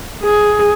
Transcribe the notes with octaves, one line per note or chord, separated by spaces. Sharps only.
G#4